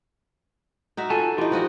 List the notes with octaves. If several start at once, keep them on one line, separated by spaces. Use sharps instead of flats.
D#4 F#4 E5
F4 A4 G#5 A5
E3 D#4 F4 G4
F3 F#4 D#5